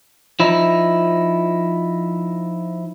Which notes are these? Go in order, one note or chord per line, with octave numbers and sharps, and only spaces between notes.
F3 D#4 E4